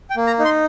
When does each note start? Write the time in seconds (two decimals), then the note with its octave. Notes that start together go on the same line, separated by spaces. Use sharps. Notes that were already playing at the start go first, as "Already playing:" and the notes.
0.10 G5
0.16 A#3
0.27 A#5
0.39 D#4
0.45 C6